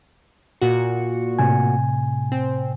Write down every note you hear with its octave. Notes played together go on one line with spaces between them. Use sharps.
A#2 F#4 C#7
A2 C3 G#5
C4